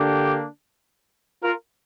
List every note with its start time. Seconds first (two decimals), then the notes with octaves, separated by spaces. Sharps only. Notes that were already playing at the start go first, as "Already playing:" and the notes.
Already playing: D3 A#3 D4 G4
1.43 F4 A#4